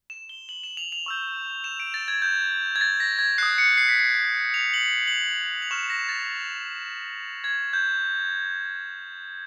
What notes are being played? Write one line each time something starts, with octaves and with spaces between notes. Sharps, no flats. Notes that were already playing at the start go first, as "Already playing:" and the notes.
E7
G7
F#7
E7
F7
F7
C#6 E6 G6
E7
D7
A6
G#6
G6
G#6
A6
A#6
G#6
D#6 F#6 C7
C#7
C7
B6
C7
F7
F#7
F#7
F#7
F7
F7
C#6 F6 E7
A#6
A6
G#6
G6